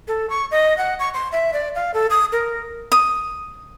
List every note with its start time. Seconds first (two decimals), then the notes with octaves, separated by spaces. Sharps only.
0.08 A4
0.30 C#6
0.51 D#5
0.78 F#5
1.00 C#6
1.14 C6
1.32 E5
1.53 D5
1.75 F5
1.94 A4
2.10 D#6
2.32 A#4
2.92 D#6